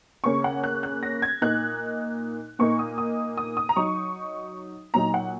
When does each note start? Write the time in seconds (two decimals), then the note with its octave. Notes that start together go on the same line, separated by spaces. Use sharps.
0.24 C#3 A#3 C#4 C#6
0.44 F#5
0.64 F#6
0.83 F#6
1.03 A#6
1.22 G#6
1.42 A#2 A#3 D#4 F#6
2.59 A#2 A#3 D#4 C#6
2.79 D#6
2.98 D#6
3.37 D#6
3.57 D#6
3.69 A#5
3.76 F#3 D#4 C#6
4.94 A#2 F#3 D#4 A#5
5.14 F#5